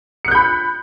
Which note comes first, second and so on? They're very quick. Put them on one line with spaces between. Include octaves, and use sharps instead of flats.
C#7 F#6 G6 B5